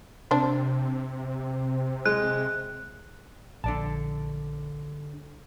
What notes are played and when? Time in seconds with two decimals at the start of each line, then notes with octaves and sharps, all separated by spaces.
0.31 C3 D4 C5
2.05 G#3 F#6
3.64 A#1 D3 D5 A5